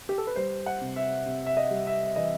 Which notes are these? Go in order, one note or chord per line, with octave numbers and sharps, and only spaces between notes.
G4
A4
B4
G3 C5
F#5
C3
E5
C3
E5
D#5
G3
E5
E3 D#5